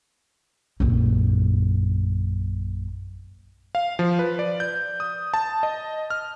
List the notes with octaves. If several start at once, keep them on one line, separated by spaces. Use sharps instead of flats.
A#1 F#2
F5
F3
B4
D5
G6
D#6
A5
D#5
F6